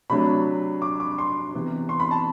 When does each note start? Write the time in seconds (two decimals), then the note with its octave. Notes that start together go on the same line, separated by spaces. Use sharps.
0.10 C3 F#3 A3 D4 B5
0.82 D6
1.00 D6
1.18 C6
1.54 C3 E3 B3
1.89 C6
2.00 B5
2.11 A5